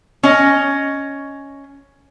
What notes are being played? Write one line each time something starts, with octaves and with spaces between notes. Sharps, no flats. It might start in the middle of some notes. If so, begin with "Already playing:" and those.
C#4 D#5